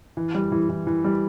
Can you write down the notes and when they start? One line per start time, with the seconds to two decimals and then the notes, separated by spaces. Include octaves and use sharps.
0.17 E3
0.34 G3
0.52 E3
0.69 E3
0.87 E3
1.04 G3